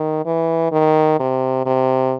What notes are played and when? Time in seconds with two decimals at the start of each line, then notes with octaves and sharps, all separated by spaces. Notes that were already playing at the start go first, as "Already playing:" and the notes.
Already playing: D#3
0.26 E3
0.72 D#3
1.20 C3
1.66 C3